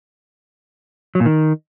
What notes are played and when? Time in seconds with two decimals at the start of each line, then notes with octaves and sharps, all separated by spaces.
1.15 F#3
1.20 A#2
1.26 D#3